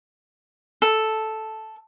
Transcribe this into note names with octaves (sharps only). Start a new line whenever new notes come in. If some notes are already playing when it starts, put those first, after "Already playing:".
A4